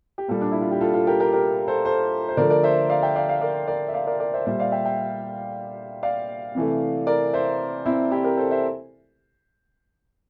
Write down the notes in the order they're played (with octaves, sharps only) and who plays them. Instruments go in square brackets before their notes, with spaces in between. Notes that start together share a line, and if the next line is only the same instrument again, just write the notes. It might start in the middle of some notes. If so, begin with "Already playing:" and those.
[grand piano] G4
A#2 G3 F4 A4
D4
E4
F4
G4
F4 A4
F4 A4
G4 A#4
G4 A#4
G4 A#4
A4 C5
A4 C5
C5
D3 F3 A3 A#4 D5
A#4 D5
C5 E5
D5 F5
E5 G5
D5 F5
D5 F5
A#4 D5
A#4 D5
E5
D5 F5
A#4 D5
A#4 D5
C5 E5
A#2 G3 C5 E5
D5 F5
E5 G5
E5 G5
D5 F5
C3 E3 A3
A#4 D5
C5 E5
C4 E4
E4 G4
G4 A#4
A4 C5
C5 E5